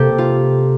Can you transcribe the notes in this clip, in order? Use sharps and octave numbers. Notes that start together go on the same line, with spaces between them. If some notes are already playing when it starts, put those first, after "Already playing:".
Already playing: C3 A#3 G4 A4 C5
F4